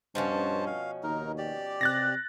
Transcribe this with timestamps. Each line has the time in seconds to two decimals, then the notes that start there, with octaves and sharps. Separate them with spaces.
0.15 G2 B2 F3 C#4 C5 A5
0.67 F5
1.03 D#2 D#4 A#4
1.38 G4 D5
1.81 C3 F#6 A6 A#6